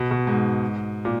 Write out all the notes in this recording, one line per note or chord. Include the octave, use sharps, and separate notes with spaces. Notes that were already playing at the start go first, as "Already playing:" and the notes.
Already playing: B2
B2
G#2
A#2